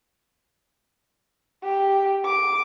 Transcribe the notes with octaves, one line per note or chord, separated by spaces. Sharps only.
G4
D6